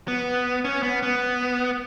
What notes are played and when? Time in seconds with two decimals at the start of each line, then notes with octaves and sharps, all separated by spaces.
0.08 B3
0.64 C#4
0.83 B3
1.03 B3